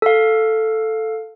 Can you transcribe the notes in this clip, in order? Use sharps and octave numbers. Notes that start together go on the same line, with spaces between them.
A4 F5